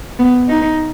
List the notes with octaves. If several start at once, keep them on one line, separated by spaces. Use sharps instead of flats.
B3
D#4